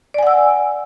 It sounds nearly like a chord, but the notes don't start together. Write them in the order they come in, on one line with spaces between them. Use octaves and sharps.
D5 G#5 F#5 E6